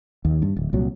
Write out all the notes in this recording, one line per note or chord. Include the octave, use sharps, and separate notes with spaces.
D#2
G2
D1
C2 A#2 F#3